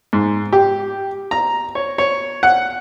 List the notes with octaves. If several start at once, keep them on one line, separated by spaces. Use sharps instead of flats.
G#2
G4
A#5
C#5
C#5
F#5